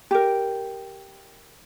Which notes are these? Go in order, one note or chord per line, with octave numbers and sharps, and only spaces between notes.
G4 A#4